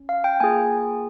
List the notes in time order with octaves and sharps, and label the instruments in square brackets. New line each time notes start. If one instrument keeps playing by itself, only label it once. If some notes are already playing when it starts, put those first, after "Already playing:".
Already playing: [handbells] C#4
F5
G5
A#3 F4 G#4 G#5